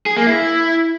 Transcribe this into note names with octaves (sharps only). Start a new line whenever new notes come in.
G#4
A#3
E4